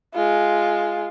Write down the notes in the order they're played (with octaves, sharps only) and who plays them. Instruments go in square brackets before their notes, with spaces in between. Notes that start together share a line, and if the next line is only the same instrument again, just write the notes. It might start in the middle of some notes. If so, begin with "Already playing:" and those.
[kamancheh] G#3 F4